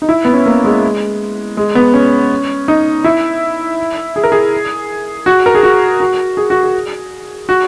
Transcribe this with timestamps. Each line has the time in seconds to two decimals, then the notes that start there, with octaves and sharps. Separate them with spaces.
0.02 D#4
0.09 E4
0.25 B3
0.33 C#4
0.46 A#3
0.65 G#3
1.57 G#3
1.75 B3
1.94 C#4
2.68 D#4
3.04 E4
4.16 G#4
4.24 A#4
4.32 G#4
5.26 F#4
5.46 A#4
5.55 G#4
5.63 F#4
6.00 F#4
6.37 G#4
6.50 F#4
6.63 G#4
7.49 F#4